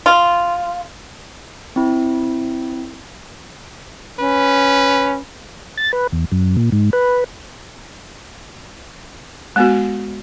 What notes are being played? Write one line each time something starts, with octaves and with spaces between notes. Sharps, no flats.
F4
C4 E4
C#4 B4
A6
B4
E2
F#2
A#2
G#2
B4
G#3 B3 F#4